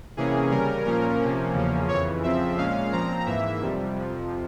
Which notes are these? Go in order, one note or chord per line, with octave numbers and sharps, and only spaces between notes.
C3 E3 A#3 C#4 G#4
C#3 G3 C#4 A#4
A#2 F3 A#3 C#4 A#4
C3 F3 A#3 C#4
E2 C#3 F3 A#3 C#4
F2 C#3 E3 C#5
F2 C#3 F3 C4 E5
A#2 G#3 C#4 F5
A#2 F3 C4 A#5
G#2 E3 A#3 E5
F2 C3 G3
F2 C3 F3